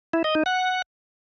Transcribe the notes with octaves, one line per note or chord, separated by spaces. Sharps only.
E4
D#5
D#4
F#5